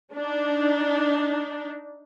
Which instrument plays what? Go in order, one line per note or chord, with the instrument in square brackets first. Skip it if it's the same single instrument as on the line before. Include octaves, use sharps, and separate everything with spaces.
[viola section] D4 D#4